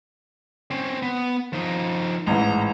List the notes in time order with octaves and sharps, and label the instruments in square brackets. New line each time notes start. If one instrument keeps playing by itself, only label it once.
[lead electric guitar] C4 C#4
B3
F3 D#4
[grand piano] A1 G#2 E3 [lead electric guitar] A#5